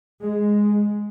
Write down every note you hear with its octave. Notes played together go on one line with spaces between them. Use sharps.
G#3